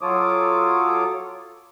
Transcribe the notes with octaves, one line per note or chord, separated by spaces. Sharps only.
F#3 F4 A4 C#5 D6 D#6